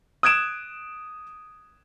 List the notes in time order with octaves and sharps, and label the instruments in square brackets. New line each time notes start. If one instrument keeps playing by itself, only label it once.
[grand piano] D#6 F#6 G#6 D7 E7